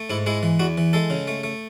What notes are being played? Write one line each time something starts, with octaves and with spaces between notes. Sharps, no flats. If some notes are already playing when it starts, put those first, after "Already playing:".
Already playing: A3
G#2 E4
G#3 E4
E3
E2 F#4
E3
G#3 A4
C#3
A3
A3